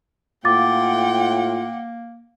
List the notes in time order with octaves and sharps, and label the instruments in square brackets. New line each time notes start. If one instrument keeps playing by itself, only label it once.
[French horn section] A2 F4 [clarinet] A#3 [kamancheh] F#5 G5 [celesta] D6 A6